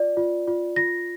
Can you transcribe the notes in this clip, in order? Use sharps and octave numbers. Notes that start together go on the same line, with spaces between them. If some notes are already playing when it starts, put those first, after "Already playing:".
Already playing: F4 D5
F4
F4
F4 A#6